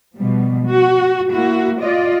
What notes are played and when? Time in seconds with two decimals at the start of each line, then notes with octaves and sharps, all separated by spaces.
0.16 B2 F3 G3
0.66 F#4
1.32 A#3 E4 F#4
1.81 F4 D5 D#5